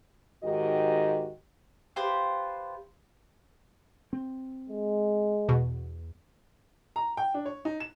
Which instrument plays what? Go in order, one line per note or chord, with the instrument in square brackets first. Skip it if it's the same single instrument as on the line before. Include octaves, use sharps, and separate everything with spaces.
[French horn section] G#2 D#3 F#4 G4 D#5
[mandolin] F4 G4 B4 C5
[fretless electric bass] C4
[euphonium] G#3
[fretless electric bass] E2 [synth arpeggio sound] B2
[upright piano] A#5
G5
D4
C#5
D#4
E7